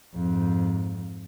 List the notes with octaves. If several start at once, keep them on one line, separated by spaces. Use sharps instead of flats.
F2 G#2